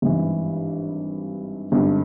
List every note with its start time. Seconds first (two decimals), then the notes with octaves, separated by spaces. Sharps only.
0.02 G#1 G2 E3
1.72 G#1 G2 D3